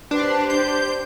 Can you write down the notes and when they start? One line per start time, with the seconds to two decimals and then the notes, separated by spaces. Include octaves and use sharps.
0.11 D4 G4 B4 C5
0.50 D4 G6